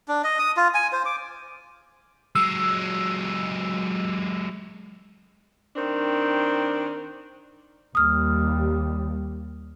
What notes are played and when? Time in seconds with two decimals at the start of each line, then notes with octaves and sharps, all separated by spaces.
0.08 D4
0.24 D#5
0.39 D#6
0.57 F4
0.74 G#5
0.93 C5
1.05 D6
2.35 F#3 G#3 E6
5.76 D#3 C4 D4
7.95 D#2 G3 D#6 F6